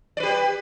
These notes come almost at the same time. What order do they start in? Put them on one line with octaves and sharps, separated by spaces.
D5 B4 G4